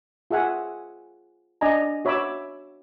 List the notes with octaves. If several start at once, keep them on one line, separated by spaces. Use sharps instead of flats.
F4 G#4 E5 F#5 G#5
D4 D5 D#5 G#5 A#5
F#4 C#5 E5 B5 D6 E6